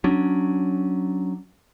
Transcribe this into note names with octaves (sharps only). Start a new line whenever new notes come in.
F#3 C#4 D4